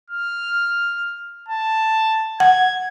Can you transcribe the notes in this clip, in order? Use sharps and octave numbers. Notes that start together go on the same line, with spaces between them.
F6
A5
F#5 G#6